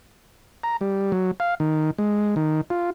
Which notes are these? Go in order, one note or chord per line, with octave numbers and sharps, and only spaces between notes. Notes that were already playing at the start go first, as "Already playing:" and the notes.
A#5
G3
F#3
F5
D#3
G#3
D#3
F4